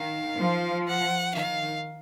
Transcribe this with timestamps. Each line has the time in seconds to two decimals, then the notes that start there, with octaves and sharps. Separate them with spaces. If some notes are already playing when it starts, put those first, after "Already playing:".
Already playing: D#3 F5
0.39 F3
0.87 F#5
1.34 D#3 F5